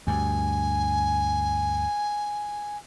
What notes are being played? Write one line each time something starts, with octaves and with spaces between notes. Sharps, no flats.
D2 G2 G#5